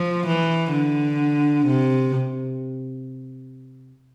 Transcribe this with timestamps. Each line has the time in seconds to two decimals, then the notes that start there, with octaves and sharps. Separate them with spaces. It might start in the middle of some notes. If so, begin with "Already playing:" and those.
Already playing: F3
0.27 E3
0.72 D3
1.66 C3